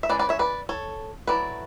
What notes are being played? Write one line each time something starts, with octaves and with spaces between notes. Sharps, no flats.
E5
G#3 C#4 E4 B4 D5
B4 D5
C#5 E5
B4 D5
A4 C#5
F#3 A3 E4 B4 D5